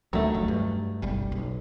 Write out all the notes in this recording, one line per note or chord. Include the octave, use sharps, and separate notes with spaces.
D1 D2 D#3 F#3 A3
E1 F2
G2
F#1 B1 G3
B1